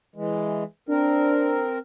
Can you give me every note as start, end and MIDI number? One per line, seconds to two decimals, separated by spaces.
0.16 0.64 52
0.16 0.64 56
0.89 1.78 60
0.89 1.65 62
0.89 1.78 70